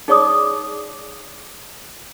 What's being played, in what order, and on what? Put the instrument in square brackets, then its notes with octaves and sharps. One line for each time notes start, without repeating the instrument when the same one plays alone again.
[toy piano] D#4 G#4 C#5 D5 D6 D#6